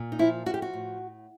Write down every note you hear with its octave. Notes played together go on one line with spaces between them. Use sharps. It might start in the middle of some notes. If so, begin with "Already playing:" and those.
Already playing: A#2
D#4
F3 E4
F3 F#4
G4
F#4
A2